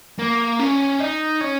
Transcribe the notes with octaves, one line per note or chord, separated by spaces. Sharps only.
A#3
C#4
D#4
C#4